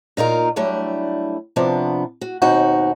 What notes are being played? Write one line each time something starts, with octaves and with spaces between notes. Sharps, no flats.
A#2 D#4 F4 A#4
F#3 G3 A3 D4 E4
C3 F3 B3 D4
F#4
D#2 B2 C4 D#4 F#4 F#5